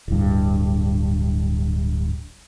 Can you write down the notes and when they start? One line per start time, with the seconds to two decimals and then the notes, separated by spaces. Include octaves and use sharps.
0.08 D1 G2